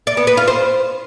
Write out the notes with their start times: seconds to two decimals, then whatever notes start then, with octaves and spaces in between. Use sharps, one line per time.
0.07 D5
0.17 B3
0.27 B4
0.37 F4
0.47 C5